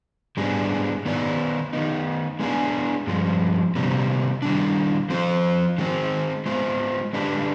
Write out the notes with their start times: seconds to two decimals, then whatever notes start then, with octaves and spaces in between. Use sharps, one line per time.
0.37 G#2 G3 B3 D4 G#4
1.05 D#3 B3 D#4 B4 D5
1.73 D#3 B3 D#4
2.40 G#3 B3 D4 G#4
3.07 G2 F3 G#3
3.75 C3 D#3 G3 B3
4.42 D#3 G3 D4
5.10 F3 C4 F4 C5
5.78 D#3 G#3 C4
6.46 G#3 B3 F4 C5
7.13 D3 G#3 D4 G4 B4